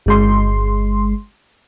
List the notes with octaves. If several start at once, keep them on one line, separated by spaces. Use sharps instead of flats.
G1 G#3 C6